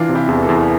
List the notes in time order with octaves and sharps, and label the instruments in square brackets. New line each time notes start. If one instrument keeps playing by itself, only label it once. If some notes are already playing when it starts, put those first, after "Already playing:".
Already playing: [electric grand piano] E3 [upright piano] D4 F4
[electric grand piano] C3
[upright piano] E4 G4
[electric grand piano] E2
[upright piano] F4 A4
[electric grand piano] E2
[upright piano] A#4